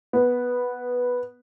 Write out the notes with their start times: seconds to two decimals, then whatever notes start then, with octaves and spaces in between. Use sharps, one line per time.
0.13 B3